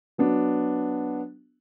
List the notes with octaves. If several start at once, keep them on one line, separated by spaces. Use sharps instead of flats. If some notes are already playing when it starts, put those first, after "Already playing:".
F#3 B3 D4